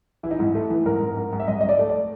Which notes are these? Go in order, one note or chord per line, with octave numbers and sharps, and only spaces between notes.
E3 E4
D#4
G#2 E4
A3
E3
G#2 A#4
G#2
G#2
G#2
E5
G#2 D#5
D#5
G#2
D5
A3
D5